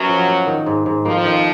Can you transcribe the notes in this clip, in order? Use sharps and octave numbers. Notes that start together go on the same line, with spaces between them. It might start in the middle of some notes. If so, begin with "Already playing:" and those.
Already playing: F#2 F#3 B3
F3
A#3
D#3
G#2
G#2
F2 F3 A#3
D#3